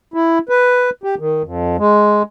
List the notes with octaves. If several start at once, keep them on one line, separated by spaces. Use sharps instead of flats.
E4
B4
G4
D#3
F2
G#3